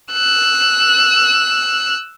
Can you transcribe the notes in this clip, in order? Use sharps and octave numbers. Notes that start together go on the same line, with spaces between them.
E6 F#6